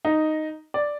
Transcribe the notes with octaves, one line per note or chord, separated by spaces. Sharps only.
D#4
D5